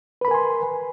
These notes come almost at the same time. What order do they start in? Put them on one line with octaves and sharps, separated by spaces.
B4 B5 A#4 G#5 C6